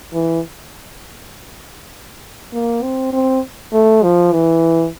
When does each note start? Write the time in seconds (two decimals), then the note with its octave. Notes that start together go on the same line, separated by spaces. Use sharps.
0.13 E3
2.53 A#3
2.83 C4
3.13 C4
3.73 A3
4.03 F3
4.33 E3